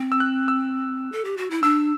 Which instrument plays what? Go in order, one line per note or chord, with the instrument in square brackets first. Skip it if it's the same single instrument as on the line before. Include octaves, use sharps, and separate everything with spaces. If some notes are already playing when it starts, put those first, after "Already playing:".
Already playing: [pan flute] C4
[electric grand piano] E6
F#6
E6
[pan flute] A4
G4
F#4
E4
[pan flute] D4 [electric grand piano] E6